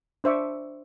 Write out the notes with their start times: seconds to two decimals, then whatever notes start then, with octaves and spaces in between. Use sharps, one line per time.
0.24 D4 C5 E5 C#6 D6